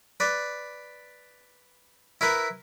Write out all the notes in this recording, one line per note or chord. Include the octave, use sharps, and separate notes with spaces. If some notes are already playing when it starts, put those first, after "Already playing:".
B4 D5
E4 A#4 B4